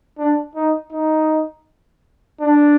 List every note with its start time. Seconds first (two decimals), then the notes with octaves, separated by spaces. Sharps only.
0.18 D4
0.56 D#4
0.92 D#4
2.41 D4